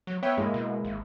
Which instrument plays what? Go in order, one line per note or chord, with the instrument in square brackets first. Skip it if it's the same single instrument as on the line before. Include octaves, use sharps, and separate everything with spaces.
[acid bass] F#3
[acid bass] B3 [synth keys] C#5 E5 G5
[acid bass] G2 [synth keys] G#3 A#3 E4
[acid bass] B2
G#1